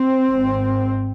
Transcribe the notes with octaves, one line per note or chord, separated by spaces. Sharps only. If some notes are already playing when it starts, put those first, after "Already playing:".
Already playing: C4
G#1 G#2